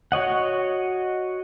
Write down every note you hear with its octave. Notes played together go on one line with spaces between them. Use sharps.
F#4 C#5 D#5 F#5